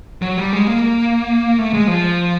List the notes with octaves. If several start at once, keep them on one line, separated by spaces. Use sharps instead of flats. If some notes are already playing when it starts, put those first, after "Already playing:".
F#3
G3
G#3
A#3
A3
G#3
F3